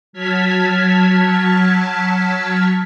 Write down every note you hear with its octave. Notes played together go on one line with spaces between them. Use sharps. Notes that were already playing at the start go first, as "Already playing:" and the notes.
F#3 A5 F6 G#6 B6